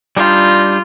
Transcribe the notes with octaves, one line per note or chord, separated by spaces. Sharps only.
G3 D4 D#4 F4